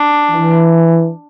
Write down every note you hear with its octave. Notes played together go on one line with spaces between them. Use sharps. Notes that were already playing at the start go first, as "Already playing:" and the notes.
Already playing: D4
E3